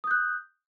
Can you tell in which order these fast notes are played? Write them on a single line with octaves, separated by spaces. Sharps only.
D#6 G6 F#6